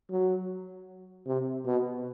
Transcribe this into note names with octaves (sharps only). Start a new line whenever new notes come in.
F#3
C3
B2